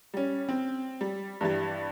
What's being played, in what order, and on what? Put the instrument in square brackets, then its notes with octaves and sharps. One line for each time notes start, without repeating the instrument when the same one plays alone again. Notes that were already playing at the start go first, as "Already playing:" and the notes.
[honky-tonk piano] G3 C#4
C4
G3
G2 E3 G3